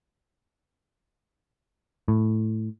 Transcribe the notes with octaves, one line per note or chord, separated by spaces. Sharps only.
A2